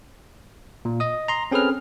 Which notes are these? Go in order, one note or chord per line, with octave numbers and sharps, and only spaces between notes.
A#2
D#5 D#6
A#5 C6
C4 C#4 G#4 A4 B4 F6